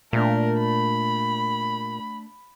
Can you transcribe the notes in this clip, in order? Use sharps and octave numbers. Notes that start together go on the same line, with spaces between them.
A#2 A3 D4 A#4
B5